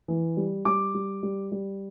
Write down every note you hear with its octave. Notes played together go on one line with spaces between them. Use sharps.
E3
G3
G3 D6
G3
G3
G3